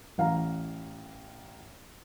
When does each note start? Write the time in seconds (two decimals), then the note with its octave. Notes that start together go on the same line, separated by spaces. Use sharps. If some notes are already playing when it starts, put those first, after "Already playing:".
0.18 A1 F5 A#5